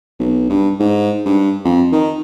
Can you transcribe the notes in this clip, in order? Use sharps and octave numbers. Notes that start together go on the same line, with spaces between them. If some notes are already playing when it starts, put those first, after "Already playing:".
B1
G2
G#2
G2
F2
D#3